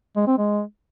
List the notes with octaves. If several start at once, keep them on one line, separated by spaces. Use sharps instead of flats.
G#3
C4
G#3